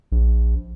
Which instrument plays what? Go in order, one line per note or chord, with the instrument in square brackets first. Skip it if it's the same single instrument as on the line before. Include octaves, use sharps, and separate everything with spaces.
[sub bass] A#1